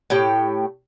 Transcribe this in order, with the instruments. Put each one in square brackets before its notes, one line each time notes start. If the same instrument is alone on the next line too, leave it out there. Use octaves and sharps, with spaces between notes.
[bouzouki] A2 G4 G5